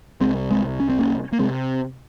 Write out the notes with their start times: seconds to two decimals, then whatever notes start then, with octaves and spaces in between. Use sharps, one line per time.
0.21 C2 G#3 C4
0.26 C3
0.51 G#3 C4
0.80 C#4
0.89 C4
0.99 A#3 C#4
1.32 A#3
1.39 C3 G#3 C4